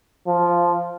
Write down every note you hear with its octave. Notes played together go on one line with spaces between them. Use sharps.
F3